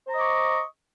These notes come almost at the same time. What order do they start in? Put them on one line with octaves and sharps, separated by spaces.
C5 A#5 D#5 D6 C#6